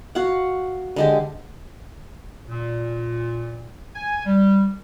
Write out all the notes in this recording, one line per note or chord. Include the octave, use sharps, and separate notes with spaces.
F#4 F5 F#5
D3 G#3 G4
A#2
G#5
G3